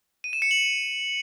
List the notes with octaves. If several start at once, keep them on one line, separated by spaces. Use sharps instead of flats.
D#7
E7
C#7
F#7